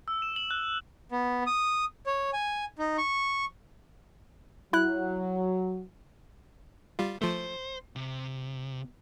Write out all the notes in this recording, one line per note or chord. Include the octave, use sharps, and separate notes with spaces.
E6
E7
F#7
F#6
B3
D#6
C#5
G#5
D#4
C#6
F#3 E4 F#6
G3 F4
F3 A3 C5
C3